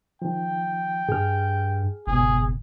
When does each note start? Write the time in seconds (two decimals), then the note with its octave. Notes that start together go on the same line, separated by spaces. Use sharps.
0.22 D#3 F3 G5
1.09 G2 G#4 F6
2.07 F#1 D#2 G#2 B2 G#4